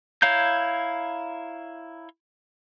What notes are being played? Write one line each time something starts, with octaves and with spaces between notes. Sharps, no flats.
E4 C#5 F5 A#5 G6